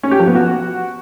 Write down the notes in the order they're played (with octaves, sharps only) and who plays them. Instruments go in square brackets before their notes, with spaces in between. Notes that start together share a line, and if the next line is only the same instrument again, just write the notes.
[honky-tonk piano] C#4
G4
F3
B3
F#4